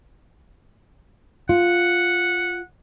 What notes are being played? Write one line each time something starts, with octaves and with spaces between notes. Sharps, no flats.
F4 F#5